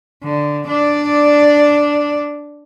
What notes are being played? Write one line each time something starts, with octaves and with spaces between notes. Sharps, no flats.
D3
D4 D5